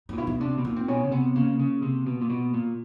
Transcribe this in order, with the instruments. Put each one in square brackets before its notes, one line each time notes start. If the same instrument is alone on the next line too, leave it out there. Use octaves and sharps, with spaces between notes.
[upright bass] D#4
[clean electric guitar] A#2
[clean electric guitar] B2 [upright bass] E4
[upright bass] D#4
[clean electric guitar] C3 [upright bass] D4
[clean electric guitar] B2
[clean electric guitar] A#2 [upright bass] D#4
[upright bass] C4
[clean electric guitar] B2 [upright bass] C#4
[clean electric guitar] C#3
[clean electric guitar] C3 [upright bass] B3
[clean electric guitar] C#3 [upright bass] A#3
[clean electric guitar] C#3
C3
B2
A#2
B2
A#2